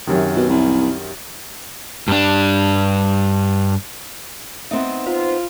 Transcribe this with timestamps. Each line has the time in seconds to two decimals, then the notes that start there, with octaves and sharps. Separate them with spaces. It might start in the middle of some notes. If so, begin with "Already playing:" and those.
0.07 F#2 C3 D#3
0.36 B2
0.49 C2
2.08 G2 D4
4.71 B3 C4 D#4 E5
5.06 F4 C5